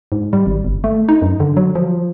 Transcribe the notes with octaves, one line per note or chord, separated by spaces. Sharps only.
G#2
G3
G#1
G1
A3
D#4
F#2
D3
F#3
F3